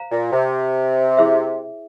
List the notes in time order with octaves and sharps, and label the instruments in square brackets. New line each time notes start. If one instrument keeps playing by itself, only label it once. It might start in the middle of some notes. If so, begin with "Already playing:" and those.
Already playing: [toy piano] C5 F5 A#5
[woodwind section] A#2
C3
[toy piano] E4 G#4 C5 E5